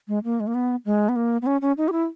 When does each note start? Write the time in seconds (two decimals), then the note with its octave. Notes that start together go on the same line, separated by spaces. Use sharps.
0.08 G#3
0.24 A#3
0.40 G#3
0.47 A#3
0.54 B3
0.85 G#3
1.09 B3
1.16 A#3
1.42 B3
1.46 C#4
1.62 C#4
1.77 D#4
1.88 G4
1.92 E4